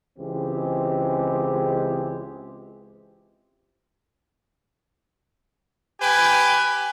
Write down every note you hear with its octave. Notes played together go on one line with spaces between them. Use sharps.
C#2 E3 G#3 C4 G4
G4 B4 G5 G#5